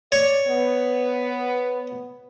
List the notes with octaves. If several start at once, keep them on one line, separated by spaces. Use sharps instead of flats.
C#5 D5
B3